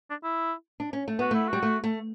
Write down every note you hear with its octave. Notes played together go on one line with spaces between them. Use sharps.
D4
E4
D4
C#4
A3
B3 F#4
A3 E4
F#4
G3
A3
A3